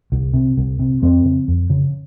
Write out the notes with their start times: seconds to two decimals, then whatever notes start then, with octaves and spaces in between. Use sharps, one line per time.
0.12 C2
0.34 C3
0.57 C2
0.79 C3
1.02 F2 C4
1.25 C#3
1.48 F2
1.70 C#3